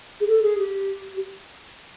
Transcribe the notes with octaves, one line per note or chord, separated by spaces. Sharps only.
G#4
A4
G#4
G4